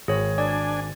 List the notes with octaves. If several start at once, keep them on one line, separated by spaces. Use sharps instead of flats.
G#1 G#4 C#5
D4 D5 G#5